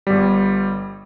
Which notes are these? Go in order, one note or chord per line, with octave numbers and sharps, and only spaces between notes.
G1 G3